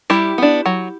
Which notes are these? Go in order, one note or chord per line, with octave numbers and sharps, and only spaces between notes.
G3 E4 G4
B3 D4
F#3